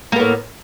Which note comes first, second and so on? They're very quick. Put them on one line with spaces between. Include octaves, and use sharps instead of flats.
A#3 B3 A2